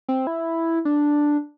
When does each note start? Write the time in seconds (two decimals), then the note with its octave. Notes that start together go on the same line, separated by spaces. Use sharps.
0.09 C4
0.27 E4
0.85 D4